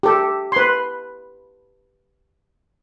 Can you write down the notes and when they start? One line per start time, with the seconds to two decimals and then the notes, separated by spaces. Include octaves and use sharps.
0.03 G4 A4
0.52 B4 C6